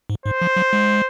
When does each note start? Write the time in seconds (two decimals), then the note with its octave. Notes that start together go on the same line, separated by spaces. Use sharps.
0.10 G#2
0.26 G#2 C5
0.41 F3
0.56 F#3
0.73 G#3